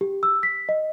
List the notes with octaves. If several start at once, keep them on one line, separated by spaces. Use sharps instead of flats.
G4
E6
B6
D#5